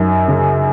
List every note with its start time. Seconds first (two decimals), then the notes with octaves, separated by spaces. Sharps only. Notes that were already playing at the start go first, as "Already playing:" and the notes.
Already playing: F#2 D#4
0.28 C#3